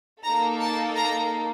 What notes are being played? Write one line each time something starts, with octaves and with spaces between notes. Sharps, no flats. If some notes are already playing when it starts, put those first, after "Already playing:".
A#3 D#4 A4 A#5
A5
A#5